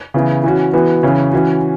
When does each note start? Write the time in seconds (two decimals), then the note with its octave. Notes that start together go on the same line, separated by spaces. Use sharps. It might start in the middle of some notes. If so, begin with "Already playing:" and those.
0.14 C#3 E3 B3 E4
0.44 E3 C#4 F#4
0.73 E3 B3 F#4
1.03 C#3 E3 C#4
1.33 E3 C#4 F#4